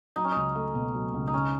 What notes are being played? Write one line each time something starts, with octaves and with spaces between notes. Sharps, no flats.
F#3 D#4
C#4
C#2 D#4
A3
B2
F#3
C#2
D#4
C#3 C#4